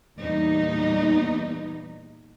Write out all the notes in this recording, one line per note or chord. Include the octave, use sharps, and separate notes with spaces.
E2 A#2 G3 B3 D#4